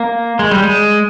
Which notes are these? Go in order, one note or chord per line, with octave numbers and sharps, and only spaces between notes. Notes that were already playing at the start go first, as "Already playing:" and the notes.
Already playing: A#3
G#3
G3
G#3